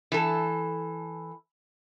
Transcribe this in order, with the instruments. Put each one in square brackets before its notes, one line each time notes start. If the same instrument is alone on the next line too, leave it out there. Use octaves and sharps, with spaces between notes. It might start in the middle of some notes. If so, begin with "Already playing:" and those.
[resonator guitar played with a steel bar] E3 A4